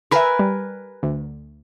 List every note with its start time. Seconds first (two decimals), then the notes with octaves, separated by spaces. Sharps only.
0.11 A#4 B4 E5 G#5 B5
0.39 G3
1.03 D2